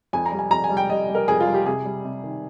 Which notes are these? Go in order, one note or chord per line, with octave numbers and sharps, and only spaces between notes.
F2 G#5
A#5
G3
G#5
F2 A#5
G#5
G3
G5
G3 D#5
G3
A#4
F2 G#4
F4
G3
G4
C3 G#4
G3
C3
D#3